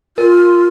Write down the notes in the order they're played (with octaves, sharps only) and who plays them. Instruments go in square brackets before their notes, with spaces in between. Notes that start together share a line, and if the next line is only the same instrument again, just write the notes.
[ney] F4 [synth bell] A#4